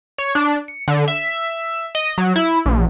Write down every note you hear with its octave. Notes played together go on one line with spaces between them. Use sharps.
C#5
D4
C#7
D3
E5
D#5
F#3
E4
A#1